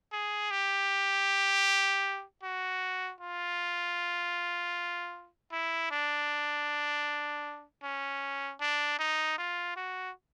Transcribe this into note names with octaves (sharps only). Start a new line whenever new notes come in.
G#4
G4
F#4
F4
E4
D4
C#4
D4
D#4
F4
F#4